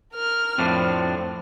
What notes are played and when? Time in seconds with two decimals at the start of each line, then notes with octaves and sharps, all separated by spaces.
0.13 A#4 F6
0.58 F2 A2 C4 D4